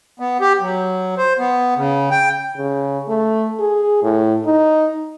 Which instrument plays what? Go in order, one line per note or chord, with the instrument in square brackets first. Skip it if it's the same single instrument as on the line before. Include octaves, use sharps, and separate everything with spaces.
[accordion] B3
G4
F#3
C5
B3
C#3
G5
[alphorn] C#3
A3
G#4
A2
D#4